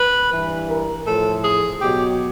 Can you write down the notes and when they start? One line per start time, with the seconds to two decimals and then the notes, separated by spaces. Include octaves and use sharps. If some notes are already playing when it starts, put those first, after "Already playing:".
Already playing: B4
0.31 G2 E3
0.69 A#4
1.07 A2 F3 A4
1.44 G#4
1.82 B2 F#3 G4